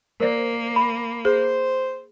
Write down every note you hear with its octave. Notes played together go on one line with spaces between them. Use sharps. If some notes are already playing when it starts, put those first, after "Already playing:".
A#3 A#4 C5 D5
B5
G#4 C5